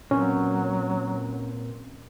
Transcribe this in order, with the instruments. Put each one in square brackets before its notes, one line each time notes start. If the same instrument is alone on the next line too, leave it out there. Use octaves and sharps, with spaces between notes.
[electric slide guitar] A#2 C4 [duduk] F#3 [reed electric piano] C#4